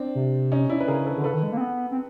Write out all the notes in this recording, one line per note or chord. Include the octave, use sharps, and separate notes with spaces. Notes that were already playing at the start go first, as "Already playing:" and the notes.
Already playing: C4 D4
C3
C#4 D#4
D4 E4
B4
C#3 G#4 A#4
A4 B4
D3
C#3 A4 B4
D#3
G#3
A#3
C4
B3
C4